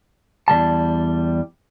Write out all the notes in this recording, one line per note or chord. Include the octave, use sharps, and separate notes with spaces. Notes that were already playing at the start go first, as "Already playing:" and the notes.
E2 F3 G3 A5